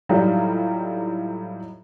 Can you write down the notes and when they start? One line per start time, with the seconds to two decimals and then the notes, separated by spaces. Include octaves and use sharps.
0.09 A2 E3 F#3 G3 D#4 F4